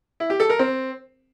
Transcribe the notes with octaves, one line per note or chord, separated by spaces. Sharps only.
E4
G4
A4
A#4
C4